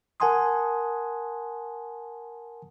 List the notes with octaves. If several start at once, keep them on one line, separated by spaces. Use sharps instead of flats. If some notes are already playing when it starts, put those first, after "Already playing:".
A#4 F#5 G#5 A5 C6 D#6